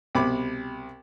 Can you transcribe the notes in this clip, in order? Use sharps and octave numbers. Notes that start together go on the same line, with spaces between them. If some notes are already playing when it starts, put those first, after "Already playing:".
C2 B2 B5 D6